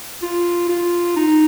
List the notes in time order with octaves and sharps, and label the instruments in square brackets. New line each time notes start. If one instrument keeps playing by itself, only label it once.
[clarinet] F4
F4
D#4